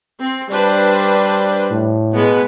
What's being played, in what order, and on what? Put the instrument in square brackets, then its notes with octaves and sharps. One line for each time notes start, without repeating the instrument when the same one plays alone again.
[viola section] C4
[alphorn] G3 [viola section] D4 B4 C5
[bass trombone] A2
[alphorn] B2 [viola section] G#3 B3